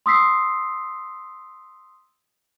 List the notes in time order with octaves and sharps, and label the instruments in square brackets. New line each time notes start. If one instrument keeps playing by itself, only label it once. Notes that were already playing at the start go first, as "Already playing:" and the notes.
[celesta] C6 D#6 E6 B6 C7